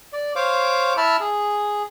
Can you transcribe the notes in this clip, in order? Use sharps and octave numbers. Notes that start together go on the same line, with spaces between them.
D5
C5 C#5 F5 D6
E4 E5 A5 B5 E6 F6
G#4